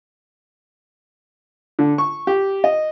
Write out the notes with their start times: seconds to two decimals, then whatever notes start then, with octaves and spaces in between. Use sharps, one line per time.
1.79 D3
1.98 C#6
2.27 G4
2.64 D#5